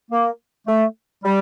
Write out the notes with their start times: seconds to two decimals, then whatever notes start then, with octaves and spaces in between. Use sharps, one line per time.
0.11 A#3
0.67 A3
1.24 G3